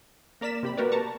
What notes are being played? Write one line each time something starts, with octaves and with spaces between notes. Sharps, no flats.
A#3 A#4 D5 B6 E7
C3 G4 B5
A#3 F#4 G4 A#4 B4 D5
A5 A#5 C#6